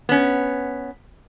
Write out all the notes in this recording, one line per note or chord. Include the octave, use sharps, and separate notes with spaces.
B3 C#4